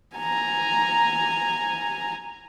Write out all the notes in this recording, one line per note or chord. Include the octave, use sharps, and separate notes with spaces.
G#5 A#5